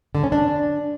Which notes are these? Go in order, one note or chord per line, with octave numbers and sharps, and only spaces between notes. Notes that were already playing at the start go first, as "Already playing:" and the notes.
D3
C#4
D4